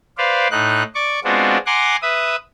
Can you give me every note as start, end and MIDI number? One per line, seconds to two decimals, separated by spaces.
0.18 0.48 71
0.18 0.48 72
0.18 0.48 74
0.18 0.48 77
0.51 0.83 45
0.51 0.83 63
0.51 0.83 90
0.95 1.20 74
0.95 1.20 85
0.95 1.20 86
1.24 1.57 56
1.24 1.57 59
1.24 1.57 60
1.24 1.57 62
1.24 1.57 65
1.24 1.57 66
1.66 1.96 78
1.66 1.96 80
1.66 1.96 82
1.66 1.96 84
1.66 1.96 86
1.66 1.96 90
2.02 2.36 71
2.02 2.36 76
2.02 2.36 87